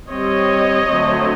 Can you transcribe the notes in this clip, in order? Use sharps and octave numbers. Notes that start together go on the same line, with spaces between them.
G3 C4 C#5 D#5
D3 F#3 A3 C4